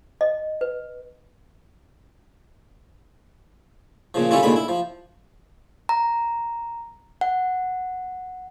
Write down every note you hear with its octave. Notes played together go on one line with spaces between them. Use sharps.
D#5
B4
A#2 C#3 F3
D3 G3 C#4 E4 F4
D#2 A#2 D3 G#3 B5
E4
F3
A#5
F#5